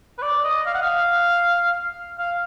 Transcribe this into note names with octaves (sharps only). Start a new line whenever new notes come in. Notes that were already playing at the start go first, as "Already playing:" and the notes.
B4
D5
D#5
F5
F#5
F5
F5